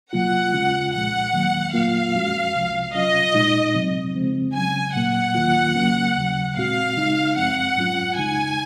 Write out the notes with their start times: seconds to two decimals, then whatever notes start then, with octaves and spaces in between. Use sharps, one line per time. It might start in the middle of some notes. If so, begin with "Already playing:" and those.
0.12 C#2 C3 F#3 A#3 F4 F#5
0.54 D#2 C#3 G#3 C#4 F4
0.93 C2 A#2 F3 G#3 F#5
1.33 D#2 D#3 F#3 A#3
1.74 A#2 F#3 A#3 F4 F5
2.14 F#2 F3 G#3 C#4 F#4
2.54 C2 C3 F3
2.94 C3 F#3 C#4 F4 D#5
3.34 A#2 G#3 D#4
3.74 C3 F#3 C4
4.15 C#3 F3 G#3 C4
4.54 C#3 F#3 C#4 G#5
4.96 A#2 F#3 A#3 F#5
5.35 D#2 D#3 F#3 A#3 F4
5.75 C#2 C#3 F#3 A#3 C#4
6.16 D#2 C#3 F#3
6.56 A#2 G#3 C4 F#4 F5
6.96 C#2 C#3 G#3 D#4
7.36 F#2 F3 G#3 C4 F#5
7.76 G#2 F#3 C#4 F4
8.16 C#2 C#3 G#3 D#4 G#5